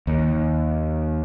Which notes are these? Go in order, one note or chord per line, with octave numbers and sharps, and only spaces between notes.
D#2